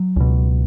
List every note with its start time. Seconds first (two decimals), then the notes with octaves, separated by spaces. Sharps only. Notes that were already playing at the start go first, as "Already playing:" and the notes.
Already playing: F#3
0.16 C#2 B2